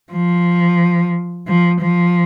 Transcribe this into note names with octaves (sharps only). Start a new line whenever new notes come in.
F3
F3
F3